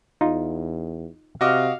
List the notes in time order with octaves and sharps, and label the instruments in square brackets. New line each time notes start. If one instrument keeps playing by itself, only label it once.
[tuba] E2 [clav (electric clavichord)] D#4 F4
[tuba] C3 [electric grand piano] F#4 D#5 D6 [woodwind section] F5